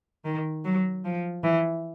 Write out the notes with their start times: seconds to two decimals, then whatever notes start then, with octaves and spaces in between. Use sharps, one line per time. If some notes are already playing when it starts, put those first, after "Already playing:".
0.25 D#3
0.65 F#3
1.04 F3
1.43 E3